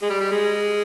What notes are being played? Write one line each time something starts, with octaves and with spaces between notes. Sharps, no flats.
G#3
G3
G3
G#3